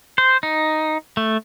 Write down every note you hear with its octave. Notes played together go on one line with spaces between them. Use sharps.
C5
D#4
A3